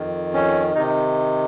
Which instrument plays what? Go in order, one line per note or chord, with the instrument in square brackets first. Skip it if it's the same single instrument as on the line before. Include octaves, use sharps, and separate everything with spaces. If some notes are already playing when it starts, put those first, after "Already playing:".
Already playing: [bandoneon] F2 D#3
C#4
C3 D#3 D#4